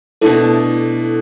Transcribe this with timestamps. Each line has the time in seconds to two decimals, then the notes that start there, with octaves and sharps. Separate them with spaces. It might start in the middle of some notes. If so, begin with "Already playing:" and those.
0.21 B2 A3 D4 E4 A4